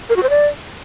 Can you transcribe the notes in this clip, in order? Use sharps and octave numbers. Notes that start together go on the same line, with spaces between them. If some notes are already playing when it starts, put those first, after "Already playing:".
A#4
F#4
C5
D5